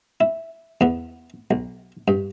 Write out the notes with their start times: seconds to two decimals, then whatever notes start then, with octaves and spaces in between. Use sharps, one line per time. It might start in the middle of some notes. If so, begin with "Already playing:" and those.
0.21 E4
0.81 E2 B3
1.51 B1
2.08 G2